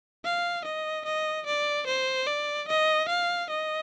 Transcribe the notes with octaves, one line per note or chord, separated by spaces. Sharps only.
F5
D#5
D#5
D5
C5
D5
D#5
F5
D#5